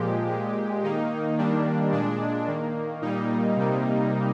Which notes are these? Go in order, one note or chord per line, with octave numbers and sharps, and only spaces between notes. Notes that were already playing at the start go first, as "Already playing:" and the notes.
Already playing: A#2 F3 G#3 G4
A#2 G#3
D#3 A#3 D#4
D#3 G3 A#3 D4
A#2 G#3 D4
D#3 A#3
A#2 G3 A#3 D#4
C3 G3 A#3